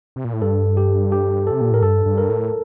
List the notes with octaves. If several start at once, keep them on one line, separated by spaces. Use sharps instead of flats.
C3
A#2
A2
G2 A4
G4
G4
C3 A4
A#2
A2 A#4
G2 A4
G2
A#4
A2